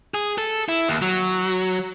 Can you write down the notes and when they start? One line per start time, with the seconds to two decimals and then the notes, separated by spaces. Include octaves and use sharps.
0.14 G#4
0.38 A4
0.69 E4
0.88 D#2
1.02 F#3